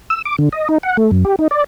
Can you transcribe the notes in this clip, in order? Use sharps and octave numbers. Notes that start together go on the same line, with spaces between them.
E6
D6
D3
D#5
D#4
F#5
A3
F#2
G4
D#4
D5